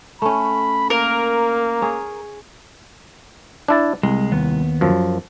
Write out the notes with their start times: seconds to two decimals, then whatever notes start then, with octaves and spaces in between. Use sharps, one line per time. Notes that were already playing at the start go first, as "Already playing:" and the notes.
0.22 A3 C#4 B5
0.90 A#3 A#4
1.82 G#4 C#5
3.68 D4 E4 A5
4.03 C2 G#3
4.32 D#2 B3
4.81 F#2 F3